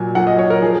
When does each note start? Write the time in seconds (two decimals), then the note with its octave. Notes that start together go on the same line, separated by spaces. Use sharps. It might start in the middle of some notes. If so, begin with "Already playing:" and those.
Already playing: A#2 F#3 G#5
0.15 A#2 F#3 F#5
0.27 D#5
0.39 C#5
0.50 A#4
0.62 F3 G#4